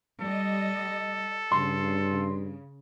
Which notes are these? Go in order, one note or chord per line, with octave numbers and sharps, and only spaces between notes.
G3 A4 D#5
G2 C#3 C6